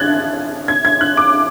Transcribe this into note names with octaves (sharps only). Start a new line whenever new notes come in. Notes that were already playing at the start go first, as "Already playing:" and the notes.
Already playing: F#6 G#6 A6
G#6
G#6
F#6
D6